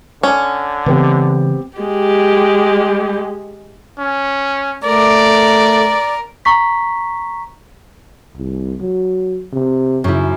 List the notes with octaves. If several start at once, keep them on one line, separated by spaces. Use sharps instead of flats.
D3 C#4
C#3 E3 G#3 B3 C4 G4
G#3 G4
C#4
A3 A#4 D5
A#5 C#6 B6
C2
F#3
C3
F#2 C#3 E4